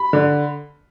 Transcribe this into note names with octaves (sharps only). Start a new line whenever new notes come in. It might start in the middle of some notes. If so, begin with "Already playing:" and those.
Already playing: B5
D3